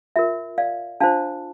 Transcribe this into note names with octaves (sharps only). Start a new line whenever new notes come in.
F4 A#4 E5
D5 F5
D4 F4 C5 F5 A5